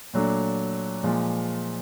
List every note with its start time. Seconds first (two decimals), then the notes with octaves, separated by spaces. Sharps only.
0.13 A#2 F#3 A3 D4
1.03 A#2 F3 G#3